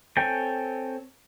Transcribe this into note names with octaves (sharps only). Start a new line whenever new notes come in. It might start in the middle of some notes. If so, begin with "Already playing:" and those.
C4 A4 C#5 G5 G#5